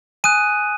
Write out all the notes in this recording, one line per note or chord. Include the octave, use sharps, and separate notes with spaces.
G#5 D#6 F#6 D#7